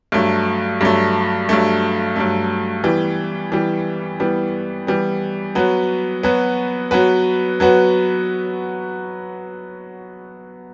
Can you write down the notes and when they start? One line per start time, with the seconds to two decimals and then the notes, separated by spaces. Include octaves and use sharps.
0.12 G2 F#3 A3
0.81 G2 F#3 A3
1.49 G2 F#3 A3
2.16 G2 F#3 A3
2.84 E3 G3 B3
3.52 E3 G3 B3
4.20 E3 G3 B3
4.87 E3 G3 B3
5.55 F#3 B3 F#4 B4
6.23 F#3 B3 F#4 B4
6.91 F#3 B3 F#4 B4
7.60 F#3 B3 F#4 B4